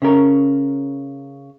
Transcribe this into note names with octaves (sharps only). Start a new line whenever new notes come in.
C#3 C#4 A#4